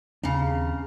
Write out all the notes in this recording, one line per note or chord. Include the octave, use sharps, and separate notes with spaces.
D#2 C#3 C4 D4 F5 A#5